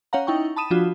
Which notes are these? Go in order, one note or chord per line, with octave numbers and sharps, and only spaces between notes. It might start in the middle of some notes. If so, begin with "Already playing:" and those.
C#4 C#5 F5 F#5 A#5
D#4 E4 G5 C#6
A5 B5 D#6 D#7 E7
F3 D4 F4 F#4